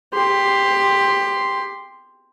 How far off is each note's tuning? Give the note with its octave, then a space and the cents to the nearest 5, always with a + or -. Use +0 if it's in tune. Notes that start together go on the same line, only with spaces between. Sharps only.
G4 +15 C6 -5